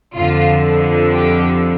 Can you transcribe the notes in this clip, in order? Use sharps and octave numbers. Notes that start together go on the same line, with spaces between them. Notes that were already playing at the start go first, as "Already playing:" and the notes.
F2 D3 F3 F4
G4